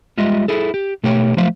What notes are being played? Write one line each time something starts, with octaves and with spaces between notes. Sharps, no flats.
G3 G#3 F4 D#5 E5
E4 G#4 A4
G4
B2 A3 G4 C#5 G5
F3 F#3 A3 C5 E5 F5